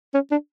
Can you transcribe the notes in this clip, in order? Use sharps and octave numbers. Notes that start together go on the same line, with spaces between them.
C#4
D4